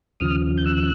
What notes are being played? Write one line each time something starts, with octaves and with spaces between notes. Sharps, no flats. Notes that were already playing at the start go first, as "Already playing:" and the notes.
D#2 C#3 F3 D#6 F6
G6
E6 F#6